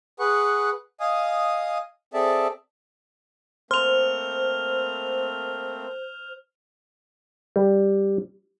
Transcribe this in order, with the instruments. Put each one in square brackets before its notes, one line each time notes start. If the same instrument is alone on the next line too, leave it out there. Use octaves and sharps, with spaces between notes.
[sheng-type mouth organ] G#4 B4 F#5 C#6
D#5 F5 G#5 D#6
C4 G#4 A4 D5 E5 A5
[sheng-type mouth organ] A3 A#3 C4 [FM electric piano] C5 [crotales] F6 F7
[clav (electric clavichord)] G3